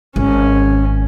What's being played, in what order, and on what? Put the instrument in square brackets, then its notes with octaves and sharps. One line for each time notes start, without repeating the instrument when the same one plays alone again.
[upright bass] G#1 [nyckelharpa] C#4